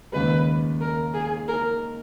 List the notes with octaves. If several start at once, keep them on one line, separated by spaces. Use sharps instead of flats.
D#2 C#3 G#3 B4
A#4
G#4
A#4